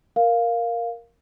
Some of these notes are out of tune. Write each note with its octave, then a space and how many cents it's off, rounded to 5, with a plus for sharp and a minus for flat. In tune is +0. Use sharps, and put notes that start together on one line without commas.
A#4 +0 F5 +0